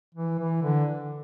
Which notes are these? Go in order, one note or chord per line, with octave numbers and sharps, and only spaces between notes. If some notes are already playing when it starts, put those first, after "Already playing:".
E3
E3
D3